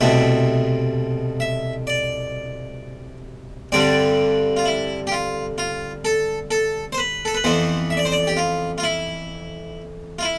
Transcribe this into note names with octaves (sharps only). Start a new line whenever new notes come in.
C2 B2 A3 C4 E5
E5
D5
G2 D3 G3 C4 D5
F4
E4
G4
F4
F4
A4
A4
C5
B4
A4
B4
F2 E3 B3 C5
E5
D5
C5
D5
G4
F4
F4
E4
F4
E4